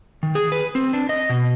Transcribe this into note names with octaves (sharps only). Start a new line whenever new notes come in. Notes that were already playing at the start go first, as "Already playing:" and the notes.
D#3
G#4
B4
C4
D4
D#5
B2